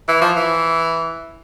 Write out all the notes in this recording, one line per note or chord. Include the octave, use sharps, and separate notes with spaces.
E3
F3
E3